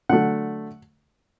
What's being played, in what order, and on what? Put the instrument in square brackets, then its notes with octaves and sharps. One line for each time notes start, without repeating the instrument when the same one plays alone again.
[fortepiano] D3 F#3 A3 F#5